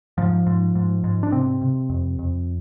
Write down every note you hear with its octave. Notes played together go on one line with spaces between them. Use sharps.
G#2 F3
G#2
G#2
G#2
D4
C3 C4
C3
F2
F2